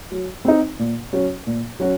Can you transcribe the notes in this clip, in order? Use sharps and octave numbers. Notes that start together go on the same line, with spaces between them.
F#3
C4 D#4
A#2
F#3 C#4 F#4
A#2
F#3 C#4 F#4